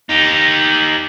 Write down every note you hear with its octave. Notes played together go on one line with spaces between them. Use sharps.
D#4 G4